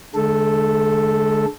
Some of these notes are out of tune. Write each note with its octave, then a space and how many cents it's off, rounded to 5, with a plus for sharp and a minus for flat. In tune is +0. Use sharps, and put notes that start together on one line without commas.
D3 +0 G#3 +30 A4 +0